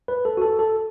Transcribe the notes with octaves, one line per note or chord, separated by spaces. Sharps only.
B4
A4
F#4
A4
A4